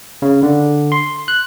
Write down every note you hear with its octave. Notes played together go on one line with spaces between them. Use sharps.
C#3
D3
C6
F#6